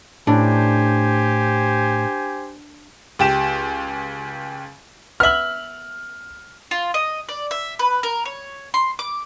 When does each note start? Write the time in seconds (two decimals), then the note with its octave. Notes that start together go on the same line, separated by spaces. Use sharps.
0.27 A2 D4 G4 C5 G#5
3.19 C#2 G4 E7
5.20 B3 E5 F6 F#7
6.71 F4
6.94 D#5
7.29 D5
7.51 E5
7.79 B4
8.03 A#4
8.25 C#5
8.74 C6
8.99 D6